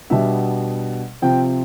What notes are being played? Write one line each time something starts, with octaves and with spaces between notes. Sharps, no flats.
B2 G3 B3 D4 E5
C3 F3 C4 G5